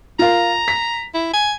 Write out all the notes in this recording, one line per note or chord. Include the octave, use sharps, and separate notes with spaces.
F4 A#4 F5 A#5
B6
E4
G#5